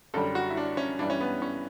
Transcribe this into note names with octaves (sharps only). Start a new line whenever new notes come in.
F#2 D3 G3 A4
F#4
E4
D4
C#4
G2 E3 G3 D4
C#4
B3
C#4